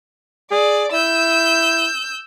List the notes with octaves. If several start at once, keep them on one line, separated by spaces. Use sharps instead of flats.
G#4 D5
E4 E6 G6